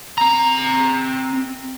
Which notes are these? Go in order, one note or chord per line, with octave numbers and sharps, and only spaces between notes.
C4 A#5